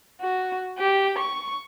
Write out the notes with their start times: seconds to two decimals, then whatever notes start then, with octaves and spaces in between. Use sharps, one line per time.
0.21 F#4
0.78 G4
1.18 C#6